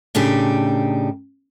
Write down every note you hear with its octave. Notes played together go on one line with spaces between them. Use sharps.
A2 C#3 D4 D#4 G4